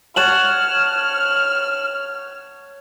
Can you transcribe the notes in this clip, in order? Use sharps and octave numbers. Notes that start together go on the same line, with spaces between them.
C#5 F#5 A5 F6 E7 F#7